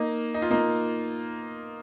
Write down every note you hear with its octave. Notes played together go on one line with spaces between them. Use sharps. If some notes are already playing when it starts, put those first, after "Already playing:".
Already playing: A#3 D#4
D#4
F4
A#3 D#4